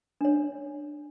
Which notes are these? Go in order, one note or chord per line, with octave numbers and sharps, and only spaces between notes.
D4 C#5